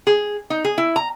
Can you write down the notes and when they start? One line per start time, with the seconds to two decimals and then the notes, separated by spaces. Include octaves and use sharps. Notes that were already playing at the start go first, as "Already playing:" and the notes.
0.07 G#4
0.50 D#4
0.65 G#4
0.78 E4
0.96 A#5